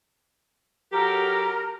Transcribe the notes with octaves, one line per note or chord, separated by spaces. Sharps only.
F#3 G4 A4 A#4